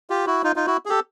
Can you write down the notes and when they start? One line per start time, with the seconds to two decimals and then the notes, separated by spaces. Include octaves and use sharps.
0.10 F4 G4
0.26 E4 F#4
0.44 D#4 F4
0.56 D#4 F4
0.67 E4 F#4
0.86 G#4
0.89 G4 A4